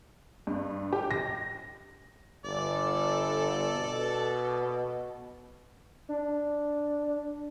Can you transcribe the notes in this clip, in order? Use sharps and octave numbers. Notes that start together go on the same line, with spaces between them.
G2
G4
A#6
G1 A4 D5
B2
D4